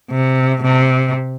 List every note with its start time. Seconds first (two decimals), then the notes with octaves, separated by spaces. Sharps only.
0.11 C3
0.63 C3